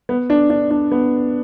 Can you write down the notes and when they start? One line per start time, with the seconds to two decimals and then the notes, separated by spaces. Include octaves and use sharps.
0.09 B3
0.30 D4
0.50 D4
0.71 D4
0.92 B3